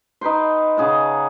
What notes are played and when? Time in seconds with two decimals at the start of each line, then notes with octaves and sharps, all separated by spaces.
0.21 D#4 B4 G5 C6
0.77 C#3 G#4 F#5 A5